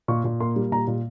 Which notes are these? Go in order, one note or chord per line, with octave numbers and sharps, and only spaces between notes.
A#2 C#6
A#2
A#3 C6
G3
A#2 A#5
A#2